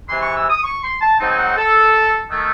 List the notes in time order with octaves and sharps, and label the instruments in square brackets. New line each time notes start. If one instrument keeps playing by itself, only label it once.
[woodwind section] C3 E3 G#3 C6
C#6
E6
D#6
C#6
C6
A5
G#2 F#3 C4 D#4 A5
G#5
F#5
A4
D#3 A3